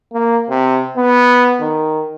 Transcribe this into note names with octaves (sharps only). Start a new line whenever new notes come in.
A#3
C3
B3
D#3